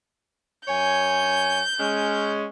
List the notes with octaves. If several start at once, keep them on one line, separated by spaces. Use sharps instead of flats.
F#2 C#5 G#5 G6
G#3 C#4